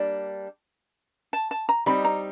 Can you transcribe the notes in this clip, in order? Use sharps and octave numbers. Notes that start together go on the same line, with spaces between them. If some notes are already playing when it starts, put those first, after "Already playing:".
Already playing: G3 A#3 D4
A5
A5
A#5
G3 C4 D#4 B5
A#5